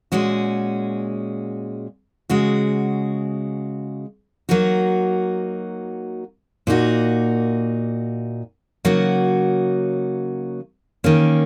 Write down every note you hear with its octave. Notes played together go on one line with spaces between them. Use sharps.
A#2 G#3 C#4 F#4
C#3 G#3 F#4
F#3 A#3 D#4 F#4
A#2 A#3 D#4 F#4
C#3 F#3 A#3 D#4 F#4
D#3 A#3 C#4